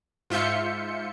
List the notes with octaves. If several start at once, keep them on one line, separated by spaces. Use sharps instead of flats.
G#2 F4 E5 G6 C#7